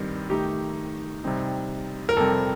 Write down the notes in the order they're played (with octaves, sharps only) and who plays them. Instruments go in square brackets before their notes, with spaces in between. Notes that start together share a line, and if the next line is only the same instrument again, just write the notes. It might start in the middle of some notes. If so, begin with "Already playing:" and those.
Already playing: [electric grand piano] G2 D#3 G3 C4
[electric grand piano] D#3 A3 D#4 [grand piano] G4
[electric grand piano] C3 G3 C4 D#4
[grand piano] A#4
[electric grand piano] F2 C3 G3 C4 [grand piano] A4